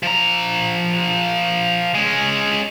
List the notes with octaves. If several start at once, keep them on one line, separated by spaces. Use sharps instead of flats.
F3 A#5
G#3 C#4